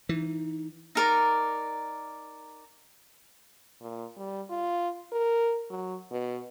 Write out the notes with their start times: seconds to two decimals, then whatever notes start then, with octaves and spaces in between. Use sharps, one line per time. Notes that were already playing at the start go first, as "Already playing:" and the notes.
0.09 E3 D#4
0.95 D#4 A#4 D5
3.81 A#2
4.17 G3
4.50 F4
5.12 A#4
5.70 F#3
6.11 B2